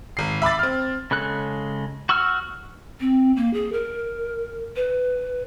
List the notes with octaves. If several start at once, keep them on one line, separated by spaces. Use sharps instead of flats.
G#1 C7
E5 B5 D6 A6
C4 F6
C#3 G#3 A4 F#6
F#4 C#6 E6 F6
C4
A#3
G#4
A#4
B4